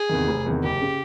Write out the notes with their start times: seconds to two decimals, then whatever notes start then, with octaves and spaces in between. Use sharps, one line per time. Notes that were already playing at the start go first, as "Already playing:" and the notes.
Already playing: G#4
0.09 E2 C3 D#3
0.27 F1
0.46 E2 C3 D#3
0.63 F#1 G4
0.81 C#3